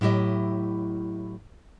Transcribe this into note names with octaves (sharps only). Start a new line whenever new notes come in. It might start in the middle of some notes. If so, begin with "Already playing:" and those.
A2 F#3 E4 G4 D#5